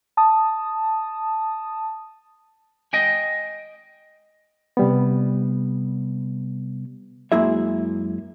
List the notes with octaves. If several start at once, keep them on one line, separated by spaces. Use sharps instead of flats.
A5 D#6
D#5 G5 G#5
C3 G3 B3
F#2 G#3 A#3 E4 G#4 E5